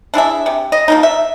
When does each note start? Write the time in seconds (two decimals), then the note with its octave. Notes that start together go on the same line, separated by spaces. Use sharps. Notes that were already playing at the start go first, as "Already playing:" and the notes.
0.14 D4 E4 G#4 E5
0.46 C3
0.72 D#5
0.88 F3 A#3 D#4
1.03 E5